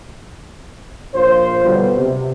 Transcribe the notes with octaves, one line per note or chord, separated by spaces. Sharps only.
A#1 F4 C5
B2 D3 F#3 G3 B3
C3